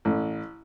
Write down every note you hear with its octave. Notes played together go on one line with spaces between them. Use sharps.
A1